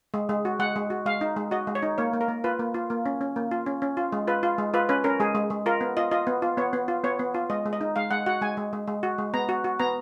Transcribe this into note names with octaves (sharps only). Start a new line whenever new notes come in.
G#3
G#3
F#4
G#3 F#5
G#3
F#4
G#3 F5
D#4
G#3
F#4 D#5
G#3
C#5
D#4
A#3 C#5
A#3
A#4
A#3
F4 B4
A#3
F4
A#3
C#4
C#4
A#3
F4
C#4
C#4
F4
G#3
F4 B4
F4
G#3
F4 B4
C#4 B4
C#4 A#4
G#3 G#4
G#3
G#3
F4 A#4
B3
F4 D#5
F4 D#5
B3
F4
B3 C#5
B3
F4
B3 C#5
B3
F4
G#3 D#5
G#3
D#5
D#4
G#3 F5
G#3 F#5
F#4 F#5
G#3 G#5
G#3
G#3
G#3
F#4
G#3
B3 A#5
F#4
F#4
B3 A#5